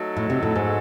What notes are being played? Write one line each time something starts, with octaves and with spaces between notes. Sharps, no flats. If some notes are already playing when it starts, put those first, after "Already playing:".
Already playing: F#3 A3 D#4 F#4 A4
A2
C3
A2
G#2